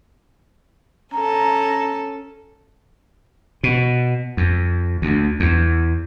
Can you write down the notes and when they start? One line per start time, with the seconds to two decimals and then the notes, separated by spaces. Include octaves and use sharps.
1.14 C#4 A4 A#5
3.63 B2
4.37 F2
5.02 D2
5.40 E2